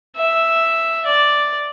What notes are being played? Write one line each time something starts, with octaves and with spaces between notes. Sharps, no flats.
E5
D5